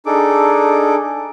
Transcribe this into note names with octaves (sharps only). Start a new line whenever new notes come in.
D4 D#4 G#4 A4 D6